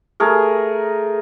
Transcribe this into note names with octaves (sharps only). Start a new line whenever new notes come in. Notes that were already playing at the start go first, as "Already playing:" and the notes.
A3 G#4 A#4